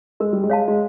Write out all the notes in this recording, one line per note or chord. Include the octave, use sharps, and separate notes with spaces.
G#3 A#4
G3
G#3
C#5 F5 A5
G#3